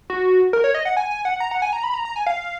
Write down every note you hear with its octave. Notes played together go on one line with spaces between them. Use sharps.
F#4
A#4
C#5
D#5
F#5
G#5
G#5
F#5
A#5
F#5
G#5
A#5
B5
A#5
A#5
G#5
F5